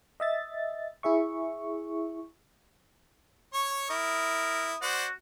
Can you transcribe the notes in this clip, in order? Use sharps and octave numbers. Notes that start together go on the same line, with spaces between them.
D#5 E5 A6
E4 G#4 E5 C#6
C#5 C#6
E4 A#4 D#6
F#4 C5 D5 F#5